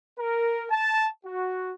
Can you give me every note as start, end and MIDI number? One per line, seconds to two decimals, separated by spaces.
0.18 0.64 70
0.70 1.05 81
1.25 1.72 66